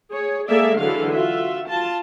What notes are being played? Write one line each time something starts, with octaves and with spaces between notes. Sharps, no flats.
G#4 C#5
G#3 A#3 G#4 A4 D5 E5
D3 E3 F#3 G#3 A4 F5
F4 F#4 E5
F4 A5